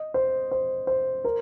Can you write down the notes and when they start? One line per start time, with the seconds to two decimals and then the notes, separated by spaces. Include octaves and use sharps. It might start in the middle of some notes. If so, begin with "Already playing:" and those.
Already playing: D#5
0.14 C5
0.51 C5
0.87 C5
1.25 A#4